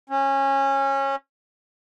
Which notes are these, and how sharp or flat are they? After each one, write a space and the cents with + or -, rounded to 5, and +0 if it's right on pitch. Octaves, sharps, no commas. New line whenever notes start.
C#4 -20